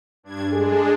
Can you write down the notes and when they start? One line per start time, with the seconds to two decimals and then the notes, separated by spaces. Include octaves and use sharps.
0.23 G2 D4 G#6
0.52 G#3 D4 G#4 A4